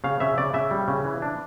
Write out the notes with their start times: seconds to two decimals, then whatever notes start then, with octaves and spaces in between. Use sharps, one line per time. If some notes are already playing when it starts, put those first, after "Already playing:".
0.04 C#3 F5
0.20 C#3 E5
0.37 C#3 D5
0.54 C#3 E5
0.71 G3
0.88 C#3
1.05 E3
1.22 D4